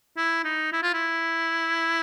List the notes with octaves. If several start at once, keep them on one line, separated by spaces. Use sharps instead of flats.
E4
D#4
E4
F4
E4